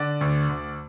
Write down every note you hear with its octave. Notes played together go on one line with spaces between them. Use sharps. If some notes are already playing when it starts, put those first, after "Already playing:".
Already playing: D3 D5 F#5
D2
D2